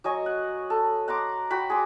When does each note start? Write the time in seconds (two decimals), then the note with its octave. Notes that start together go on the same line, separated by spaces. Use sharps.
0.04 F#3 D#5 G#5 C#6
0.26 F#5
0.70 A4
1.08 F#5 A#5 C6 D6
1.51 F#4 G5 B5
1.70 G#4 C6 D6